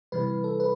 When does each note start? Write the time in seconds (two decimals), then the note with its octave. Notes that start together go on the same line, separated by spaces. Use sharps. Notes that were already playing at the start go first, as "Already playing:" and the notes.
0.12 C3 E3 G3 B4
0.44 A4
0.60 B4